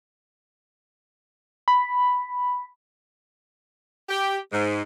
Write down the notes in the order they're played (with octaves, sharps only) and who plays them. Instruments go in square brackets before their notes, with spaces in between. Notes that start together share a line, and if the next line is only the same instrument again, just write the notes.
[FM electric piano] B5
[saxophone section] G4
G#2